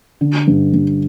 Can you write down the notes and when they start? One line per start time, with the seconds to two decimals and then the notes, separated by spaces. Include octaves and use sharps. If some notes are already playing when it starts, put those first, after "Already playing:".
0.21 D3
0.47 G2
0.74 G2